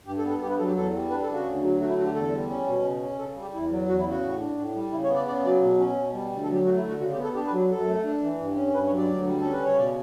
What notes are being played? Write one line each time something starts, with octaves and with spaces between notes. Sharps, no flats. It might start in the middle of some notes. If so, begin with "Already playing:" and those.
G2 G4
A4
B3
A4
G2 G4
B4
F#3 A4
G4
E2 A4
G3
D4 B4
A4
C#3 F#4
D2
F#3
A3 F#4
E4
D3 F#4
G4
E2 A4
G3
C#4
B2
C#3
C#4
C#3 A4
G3
G4
E2 E4
F#3
E2 F#4
E4
C#3
F#4
A2
D4
A2
G3
C#3 E4
C#5
B3
D5
C#3 D5
F#3 D5
B2
C#4
B2
G3
D2
A4
F#3 G4
A3 F#4
E4
D3
F#4
C#3 F#4
G4
B3
A4
D4 G4
B4
F#3
F#2 A4
A3
D4
E3
G2
C#4
G2 B4
C#5
F#3
D5
D2
G3
C#4 A4
B4
C#3 C#5
B2 D5